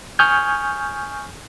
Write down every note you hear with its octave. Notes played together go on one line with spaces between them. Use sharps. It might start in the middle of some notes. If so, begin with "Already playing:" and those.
G#5 C#6 D#6 F6 G6 G#6